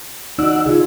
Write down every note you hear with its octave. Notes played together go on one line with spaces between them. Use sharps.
D#4 F#4 D5 F#5 E6
C#3 F4 G#4